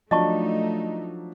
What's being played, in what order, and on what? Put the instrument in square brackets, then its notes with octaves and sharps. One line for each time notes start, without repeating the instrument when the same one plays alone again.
[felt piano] F3 F#3 D4 [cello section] A3 D#4 [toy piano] D#5 A5 C#6